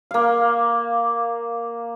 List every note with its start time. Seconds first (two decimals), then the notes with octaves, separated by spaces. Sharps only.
0.11 A#3 F5